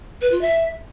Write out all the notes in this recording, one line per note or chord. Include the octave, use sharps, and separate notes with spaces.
B4
F4
E5